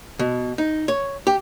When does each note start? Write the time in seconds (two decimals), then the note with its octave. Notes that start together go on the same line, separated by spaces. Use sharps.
0.19 B2
0.58 D#4
0.88 C#5
1.27 G4